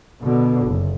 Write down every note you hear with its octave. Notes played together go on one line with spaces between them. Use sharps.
B2 D3
F#1